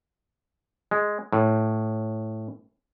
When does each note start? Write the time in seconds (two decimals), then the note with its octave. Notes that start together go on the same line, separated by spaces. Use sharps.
0.91 G#3
1.33 A2